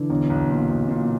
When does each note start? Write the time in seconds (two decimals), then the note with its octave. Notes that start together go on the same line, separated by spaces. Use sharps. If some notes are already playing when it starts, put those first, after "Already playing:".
Already playing: D3 E3
0.10 B1
0.30 B1
0.50 A#2
0.70 B1
0.89 A#2